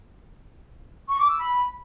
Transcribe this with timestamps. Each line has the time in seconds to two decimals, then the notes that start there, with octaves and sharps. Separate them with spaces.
1.09 C#6
1.18 D6
1.28 E6
1.38 B5